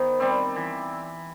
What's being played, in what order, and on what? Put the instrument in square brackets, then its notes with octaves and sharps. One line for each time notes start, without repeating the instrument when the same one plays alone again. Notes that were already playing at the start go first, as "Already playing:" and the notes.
Already playing: [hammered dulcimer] D#3 B3 [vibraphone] C5
[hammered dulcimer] G3 C4
E3